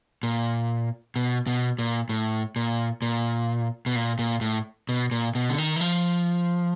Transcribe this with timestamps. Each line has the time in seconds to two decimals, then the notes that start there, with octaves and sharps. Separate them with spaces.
0.23 A#2
1.16 B2
1.47 B2
1.79 A#2
2.09 A2
2.56 A#2
3.02 A#2
3.86 B2
3.96 A#2
4.19 A#2
4.41 A2
4.89 B2
5.11 A#2
5.35 B2
5.50 D3
5.58 D#3
5.76 E3
5.81 F3